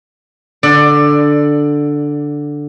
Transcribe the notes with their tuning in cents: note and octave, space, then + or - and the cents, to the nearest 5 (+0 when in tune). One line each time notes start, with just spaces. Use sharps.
D3 +0 D5 +15